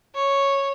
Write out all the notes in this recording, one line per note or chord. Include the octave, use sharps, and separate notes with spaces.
C#5